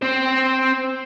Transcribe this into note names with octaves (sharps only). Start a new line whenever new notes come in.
C4 C5